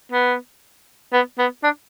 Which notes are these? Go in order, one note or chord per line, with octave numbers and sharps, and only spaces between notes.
B3
B3
B3
D4